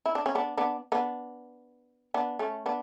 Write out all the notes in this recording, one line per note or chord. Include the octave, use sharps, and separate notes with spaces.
E4
D4
C#4
B3 D4
B3 D4
B3 D4
B3 D4
A3 C#4
B3 D4